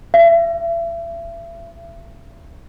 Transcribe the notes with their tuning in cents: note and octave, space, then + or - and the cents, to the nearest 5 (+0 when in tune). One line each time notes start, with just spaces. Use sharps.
E5 +35